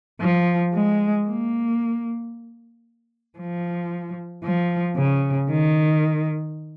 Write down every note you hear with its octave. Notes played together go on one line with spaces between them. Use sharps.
F3
G#3
A#3
F3
F3
C#3
D#3